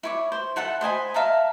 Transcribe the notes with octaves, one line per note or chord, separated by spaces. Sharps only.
E4 C#5 D6
C5
E4 A4 F#5 A5
C5 D#5 G#5 B5
E5 F5 A5 A#5